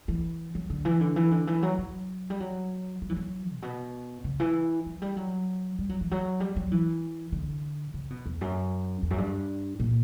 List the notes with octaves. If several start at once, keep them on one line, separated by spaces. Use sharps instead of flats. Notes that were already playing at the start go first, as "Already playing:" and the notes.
E3
F#3
D3
E3
D3
E3
D3
E3
F#3
F#3
G3
F#3
F#3
E3
F#3
A#2
B2
C#3
E3
F#3
G3
F#3
G3
F#3
E3
F#3
G3
F#3
E3
D3
C#3
B2
E2
F#2
E2
F#2
G2
A#2